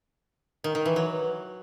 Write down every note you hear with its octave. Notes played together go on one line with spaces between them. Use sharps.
D#3
D#3
E3
F#3